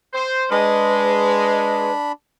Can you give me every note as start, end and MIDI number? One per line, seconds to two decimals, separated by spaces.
0.13 0.45 72
0.51 1.90 56
0.51 2.12 62
0.51 1.92 71
0.51 2.12 83